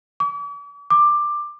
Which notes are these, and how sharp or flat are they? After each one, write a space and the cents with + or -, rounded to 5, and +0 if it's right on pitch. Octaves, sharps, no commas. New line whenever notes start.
D6 -45
D6 +15